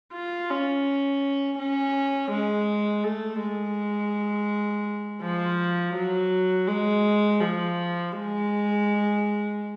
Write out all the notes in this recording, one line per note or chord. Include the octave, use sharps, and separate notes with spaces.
F4
C#4
C#4
G#3
A3
G#3
F3
F#3
G#3
F3
G#3